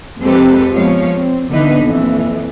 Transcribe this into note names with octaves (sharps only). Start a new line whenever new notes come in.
F2 G#3 C4 G4 A4 B4
F3 G#3 B3 C#5 F5
C4
D3 E3 B3 D4 D#4 B4
F2 A#2 E3